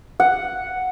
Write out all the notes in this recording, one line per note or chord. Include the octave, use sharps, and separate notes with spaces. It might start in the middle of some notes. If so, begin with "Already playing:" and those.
F#5